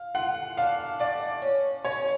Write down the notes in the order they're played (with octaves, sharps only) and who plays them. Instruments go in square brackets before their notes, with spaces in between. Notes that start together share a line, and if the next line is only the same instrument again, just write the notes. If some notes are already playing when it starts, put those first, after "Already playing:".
Already playing: [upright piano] F5
[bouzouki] F4 [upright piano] F#5
[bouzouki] D4 [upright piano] F5
[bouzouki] A3 [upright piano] D5
[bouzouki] C#4
[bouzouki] C#4 [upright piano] C#5